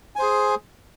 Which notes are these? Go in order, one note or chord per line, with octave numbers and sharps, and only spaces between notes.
G#4 C5 G#5